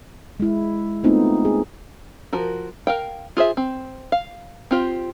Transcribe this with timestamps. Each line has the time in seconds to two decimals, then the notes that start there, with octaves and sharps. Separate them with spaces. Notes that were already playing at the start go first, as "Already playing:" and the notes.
0.40 G#3 E4
1.04 A3 B3 C4 D#4 F4
1.45 G#4
2.33 F3 F#4 A#4
2.87 A#4 F5 G5
3.37 F4 G#4 C5 E5
3.57 C4
4.12 F5
4.71 C4 F4 G4